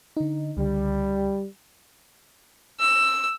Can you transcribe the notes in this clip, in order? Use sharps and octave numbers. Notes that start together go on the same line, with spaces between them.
D3 D#4
C#2 D3 G3
E6